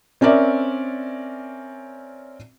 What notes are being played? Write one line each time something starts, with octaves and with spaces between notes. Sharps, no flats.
C4 C#4 A#4 D5 E5